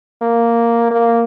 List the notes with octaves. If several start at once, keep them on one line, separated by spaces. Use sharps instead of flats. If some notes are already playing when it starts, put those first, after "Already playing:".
A#3
A#3